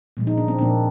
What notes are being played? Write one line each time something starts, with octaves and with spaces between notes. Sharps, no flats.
A#2 F3 G#3
D#4
D4
C4
A#2 F3 A#3 D4